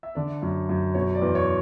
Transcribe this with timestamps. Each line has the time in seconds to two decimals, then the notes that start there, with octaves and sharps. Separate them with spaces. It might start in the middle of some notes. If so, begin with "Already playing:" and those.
0.03 E5
0.15 D3 D5
0.42 F#2
0.69 F#2
0.94 B2 C#5
1.15 D5
1.21 E2
1.35 C#5